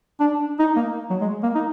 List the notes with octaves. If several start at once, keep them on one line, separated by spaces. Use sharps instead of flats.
D4
D#4
A#3
F#3
G#3
A#3
D#4